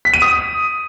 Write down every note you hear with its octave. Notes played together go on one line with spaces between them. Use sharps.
B6
D#7
D#6